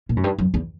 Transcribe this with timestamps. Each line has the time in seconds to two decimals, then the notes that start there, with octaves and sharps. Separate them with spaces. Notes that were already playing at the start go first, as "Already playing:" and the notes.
0.09 A#2
0.17 F#2
0.24 G2
0.39 F#2
0.54 E2